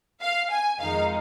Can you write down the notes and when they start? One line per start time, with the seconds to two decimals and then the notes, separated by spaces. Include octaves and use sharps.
0.21 F5
0.50 G#5
0.79 F2 D#3 G#3 D#4 F5